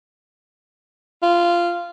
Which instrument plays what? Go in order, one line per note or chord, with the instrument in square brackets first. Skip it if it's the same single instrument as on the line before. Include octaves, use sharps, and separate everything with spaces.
[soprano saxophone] F4